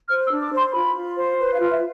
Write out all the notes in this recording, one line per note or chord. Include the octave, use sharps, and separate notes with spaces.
C5 F6
E6
D4
D6
C5 C6
F4 B5
F4
C5
B4
F5
F4
E5